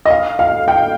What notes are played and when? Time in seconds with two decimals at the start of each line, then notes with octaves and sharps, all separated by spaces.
0.06 D#5
0.10 F5
0.39 F5
0.68 G5